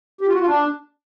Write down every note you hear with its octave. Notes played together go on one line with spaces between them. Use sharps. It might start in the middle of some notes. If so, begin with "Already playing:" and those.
G4
F4
F#4
F4
D4